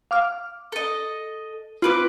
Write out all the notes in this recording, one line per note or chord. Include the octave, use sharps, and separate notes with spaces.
F5 D6 F6
A4 D#5
C4 F4 B4 D6